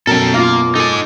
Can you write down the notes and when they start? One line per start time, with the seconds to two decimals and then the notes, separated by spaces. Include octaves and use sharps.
0.07 F#2 B2 A4 A#4 G5
0.34 A#3 F4 F5 D6
0.75 D#4 A4 G#5